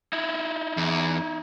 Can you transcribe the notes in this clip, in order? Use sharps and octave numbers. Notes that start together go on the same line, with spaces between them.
D#4 E4
E2